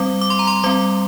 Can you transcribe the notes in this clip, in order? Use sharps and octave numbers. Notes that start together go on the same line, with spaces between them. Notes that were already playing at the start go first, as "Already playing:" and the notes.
Already playing: G3 C4 D6
D6
C6
A#5
C6
G3 C4 D6